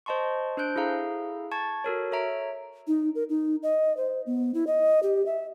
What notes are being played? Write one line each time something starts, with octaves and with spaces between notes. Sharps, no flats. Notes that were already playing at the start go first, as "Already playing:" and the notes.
C5 D#5 A5 C6 C#6
D4 C5 F#6 G6 D7
E4 G#4 A4 F5 A#5
A5 C#6 G#6 A6
F#4 A4 A#4 C#5
A4 C#5 E5 A#5 D7
D#4
A#4
D#4
D#5
C5
B3
E4
D#5
G4
E5